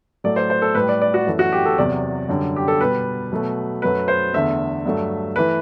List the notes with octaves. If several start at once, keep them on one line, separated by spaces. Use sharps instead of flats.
A2 F#3 A3 D5
C5
C5
A4
A2 G3 B4
D5
D5
F#4
F#2 E3 A3
F#4
G4
A4
E2 C3 F#3 D5
F#2 D3 G3
G4
A4
B2 G3 B4
B2 F#3 A3
F#2 F#3 A3 B4
C5
E2 D3 A3 E5
G2 F#3 A3
E3 A3 B4